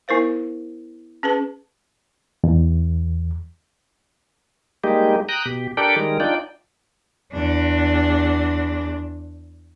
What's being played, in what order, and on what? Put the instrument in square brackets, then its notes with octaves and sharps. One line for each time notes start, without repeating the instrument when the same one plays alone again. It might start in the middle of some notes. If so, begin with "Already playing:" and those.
[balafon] B3 E4 A#4 C5 F5
C#4 G#4 B4 A5
[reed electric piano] E2
[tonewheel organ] G3 G#3 A#3 D#4 G4
G5 A#5 D#6 F#6
B2 G4
D4 G4 A4 A#4 D5 G5
D#3 G3 G#3 A#4
D4 D#4 F4 D5 G5
[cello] E2 D4